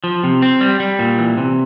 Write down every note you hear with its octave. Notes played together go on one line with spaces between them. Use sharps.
F3
C3
C4
G3
G3
A#2
E3
C3